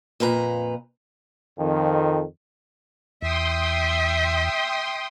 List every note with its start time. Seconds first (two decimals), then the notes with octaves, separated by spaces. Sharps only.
0.20 F2 A#2 B4 A#5
1.59 F2 D#3
3.22 E2 E5 G5 C6 D#6